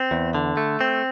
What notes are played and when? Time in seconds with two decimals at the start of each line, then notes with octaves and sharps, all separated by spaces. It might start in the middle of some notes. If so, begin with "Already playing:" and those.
Already playing: C4
0.11 E2
0.34 D3
0.57 A3
0.81 C4